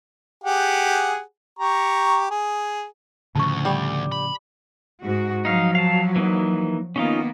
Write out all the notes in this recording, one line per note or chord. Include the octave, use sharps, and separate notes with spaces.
G4 G#4 F#5
G4 A#5 C#6
G#4
D2 A2 C#3 F3 A5 C#6
G3 G4 D6
B5
G#2 F#4
F3 F#3 D#4 F5
F5 A5
E3 A#3 D#4
D#3 A#3 B3 C#4 D#4 F4